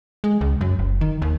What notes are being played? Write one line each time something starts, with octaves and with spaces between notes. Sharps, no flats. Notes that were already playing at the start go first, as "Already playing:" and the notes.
G#3
C#2
F#2
F#1
D#3
D#2